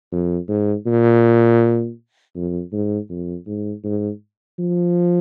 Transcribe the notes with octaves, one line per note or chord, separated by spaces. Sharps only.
F2
G#2
A#2
F2
G#2
F2
G#2
G#2
F3